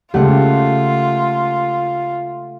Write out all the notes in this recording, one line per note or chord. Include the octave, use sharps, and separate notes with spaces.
C#3 G#3 A3 F4 G4 F#5